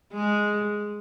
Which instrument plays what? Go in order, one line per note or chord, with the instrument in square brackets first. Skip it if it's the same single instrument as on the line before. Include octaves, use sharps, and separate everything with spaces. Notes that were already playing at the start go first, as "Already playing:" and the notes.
[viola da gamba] G#3